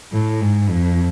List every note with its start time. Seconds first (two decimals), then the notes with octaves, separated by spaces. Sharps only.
0.13 A2
0.41 G#2
0.69 F2